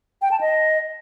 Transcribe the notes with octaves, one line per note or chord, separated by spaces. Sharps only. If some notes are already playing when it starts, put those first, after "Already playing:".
G5
A5
D#5